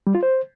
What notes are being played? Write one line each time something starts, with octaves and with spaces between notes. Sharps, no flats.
G3
F4
C5